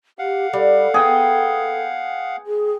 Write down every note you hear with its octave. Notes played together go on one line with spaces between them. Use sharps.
G4 F5 F#5
G3 A4
B3 G#4 G5 A#5
G#4